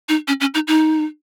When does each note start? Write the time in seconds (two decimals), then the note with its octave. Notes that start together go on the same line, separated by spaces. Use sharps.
0.09 D#4
0.28 C#4
0.41 C#4
0.54 D#4
0.68 D#4